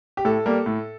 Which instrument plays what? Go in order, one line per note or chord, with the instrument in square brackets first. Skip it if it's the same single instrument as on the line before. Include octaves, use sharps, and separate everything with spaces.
[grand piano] G4
A2 A4
G3 A#3
A2